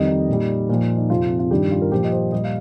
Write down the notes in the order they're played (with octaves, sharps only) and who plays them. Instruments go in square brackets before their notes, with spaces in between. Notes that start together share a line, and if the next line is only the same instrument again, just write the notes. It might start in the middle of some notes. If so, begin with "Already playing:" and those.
Already playing: [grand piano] F2 D#3 G3 D#5
D#4
A#2 G3
A#2 F3
D#4
F2 C3 F3 F4
F4
G2 D#3 G3 G4
F4
A#4
A#2 F3 G4
D#5
C5
A#2 G3 D#5
F5